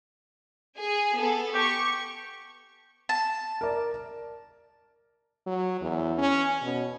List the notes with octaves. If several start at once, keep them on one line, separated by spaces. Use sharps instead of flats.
G#4 G#5
B3 A4
G4 C#6
A5
A#4 D5
F#3
E2
C#4
B2